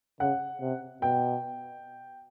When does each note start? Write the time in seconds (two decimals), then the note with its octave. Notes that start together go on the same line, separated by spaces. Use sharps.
0.20 C#3 F#5
0.61 C3
1.02 B2 G5